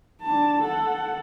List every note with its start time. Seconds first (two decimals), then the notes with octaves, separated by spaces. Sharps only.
0.22 D4 A5
0.62 A4 F#5